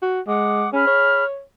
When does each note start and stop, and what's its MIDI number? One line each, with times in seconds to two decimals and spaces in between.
0.02 0.21 66
0.27 0.67 56
0.27 0.72 78
0.27 0.72 86
0.27 0.72 87
0.73 0.83 61
0.73 1.23 68
0.73 1.23 83
0.73 1.23 89
0.87 1.42 73